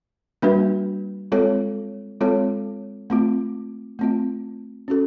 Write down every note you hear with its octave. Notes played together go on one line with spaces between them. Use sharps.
G3 A#3 D4 F#4 B4
G#3 C4 F4 A4 C#5
G#3 C4 F4 A4 C#5
A3 C4 F4
A3 C4 F4
C#4 F#4 A4